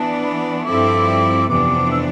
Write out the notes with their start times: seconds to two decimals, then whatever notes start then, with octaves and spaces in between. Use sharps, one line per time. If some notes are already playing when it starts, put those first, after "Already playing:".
Already playing: E3 B3 D4 A5
0.24 B5
0.66 G2 F3 C4 E4 A4 D6
1.49 F2 C3 E3 B3 D4 D6
1.91 E6